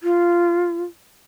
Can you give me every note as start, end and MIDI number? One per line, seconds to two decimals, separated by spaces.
0.03 0.83 65